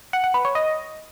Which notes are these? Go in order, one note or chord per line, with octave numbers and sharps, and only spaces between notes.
F#5
F#5
B4
C#5
D#5